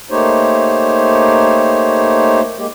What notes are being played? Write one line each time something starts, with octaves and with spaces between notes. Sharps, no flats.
A3 A#3 D#4 G4 C5 C#5
G#3 A#3 G4